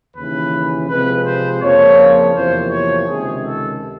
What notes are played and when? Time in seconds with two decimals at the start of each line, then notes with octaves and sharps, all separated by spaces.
0.16 D#2 C#3 E3 B4
0.89 C3 F3 G#3 C4 B4
1.26 C5
1.61 F2 C#3 F3 A#3 D4 C#5
2.34 E2 C3 F3 A#3 C5
2.71 C#5
3.07 C#2 C3 D#3 G#4
3.44 A4